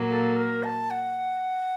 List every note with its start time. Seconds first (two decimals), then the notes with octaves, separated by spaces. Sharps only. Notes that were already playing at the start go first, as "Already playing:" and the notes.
Already playing: A#2 F#3 A#3
0.10 A4
0.36 A#4
0.64 A5
0.90 F#5